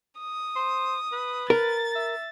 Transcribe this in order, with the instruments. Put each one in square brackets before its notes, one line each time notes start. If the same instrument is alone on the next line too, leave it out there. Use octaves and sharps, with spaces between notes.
[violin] D#6
[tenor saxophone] C5
B4
[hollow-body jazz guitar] A#4 [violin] A6
[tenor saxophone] E5